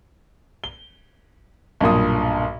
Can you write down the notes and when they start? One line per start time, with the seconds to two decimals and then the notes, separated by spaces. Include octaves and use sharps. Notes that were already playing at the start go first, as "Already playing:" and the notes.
0.64 G7
1.81 B1 G2 A#2 D#6